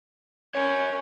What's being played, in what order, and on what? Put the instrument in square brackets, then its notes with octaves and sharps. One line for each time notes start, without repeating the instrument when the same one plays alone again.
[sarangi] C#4 [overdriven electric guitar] A#4 C#5